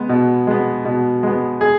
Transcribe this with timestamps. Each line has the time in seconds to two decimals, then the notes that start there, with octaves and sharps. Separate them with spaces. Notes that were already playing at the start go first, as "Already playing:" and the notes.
Already playing: G#3 B3
0.09 B2
0.47 G#3 B3
0.85 B2
1.23 G#3 B3
1.61 G#4